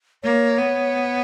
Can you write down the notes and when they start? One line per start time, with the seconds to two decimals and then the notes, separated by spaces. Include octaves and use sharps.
0.23 A#3 C#5
0.57 B3